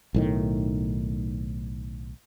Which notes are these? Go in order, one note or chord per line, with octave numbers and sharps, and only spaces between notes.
B1 A2 D#3